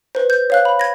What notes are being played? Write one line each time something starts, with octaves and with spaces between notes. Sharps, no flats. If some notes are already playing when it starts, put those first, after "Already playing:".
B4 C5
G6
C#5 F5 F#6
B5
G#6 A#6